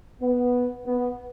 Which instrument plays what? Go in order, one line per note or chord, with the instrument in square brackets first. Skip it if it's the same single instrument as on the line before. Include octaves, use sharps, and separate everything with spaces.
[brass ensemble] B3
B3